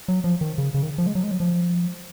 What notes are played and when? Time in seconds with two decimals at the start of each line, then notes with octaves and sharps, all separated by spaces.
0.08 F#3
0.24 F3
0.41 D#3
0.58 C#3
0.74 C#3
0.83 D#3
0.98 F3
1.07 G#3
1.15 F#3
1.23 G#3
1.31 F#3
1.40 F3